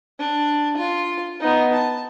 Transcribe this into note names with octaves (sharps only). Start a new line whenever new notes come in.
D4
F4
B3 D#4
A5